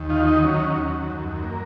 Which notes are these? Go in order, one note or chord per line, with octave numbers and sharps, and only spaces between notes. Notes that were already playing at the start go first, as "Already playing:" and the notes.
Already playing: D#2
D#3 F4
D#4
F#3 C#4
D#2
F#2
A#3